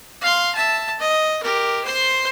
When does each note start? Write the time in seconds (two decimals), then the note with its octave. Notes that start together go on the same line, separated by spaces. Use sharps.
0.21 F5 C6
0.55 E5 A5
0.99 D#5
1.43 G4 A#4
1.84 C5 C6